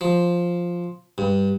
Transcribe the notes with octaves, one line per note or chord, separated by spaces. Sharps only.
F3
G2